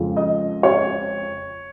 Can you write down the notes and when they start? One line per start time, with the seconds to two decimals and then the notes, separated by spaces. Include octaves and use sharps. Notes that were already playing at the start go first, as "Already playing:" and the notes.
Already playing: F2 C#3 F3 G#3
0.16 D#5
0.63 C#5